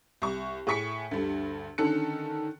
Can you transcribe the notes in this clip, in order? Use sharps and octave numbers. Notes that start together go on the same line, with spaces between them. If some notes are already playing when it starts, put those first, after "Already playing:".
C2 C#6
A2 G#4 C#6 B6 C#7
D2 G2 D3
D3 D#3 C#4 A4 F#6 C#7